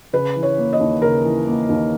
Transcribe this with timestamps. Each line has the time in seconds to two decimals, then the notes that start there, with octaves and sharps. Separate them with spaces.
0.13 C#3 B4
0.36 E3
0.43 C#5
0.58 A#3
0.73 D#5
0.80 D#2
1.02 C#3 A#4
1.24 E3
1.47 A#3
1.69 D#2